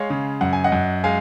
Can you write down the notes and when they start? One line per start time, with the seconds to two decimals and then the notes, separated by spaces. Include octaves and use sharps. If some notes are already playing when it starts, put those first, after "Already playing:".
Already playing: G#3 C#5 F5
0.10 C#3
0.41 F#2 F#5
0.53 G#5
0.64 D#5 F#5
0.72 F#2
1.04 G#3 F5 G#5